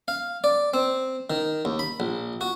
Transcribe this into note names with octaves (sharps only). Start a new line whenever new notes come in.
F5
D5
C4
D#3
D#2
B5
A#1
F#4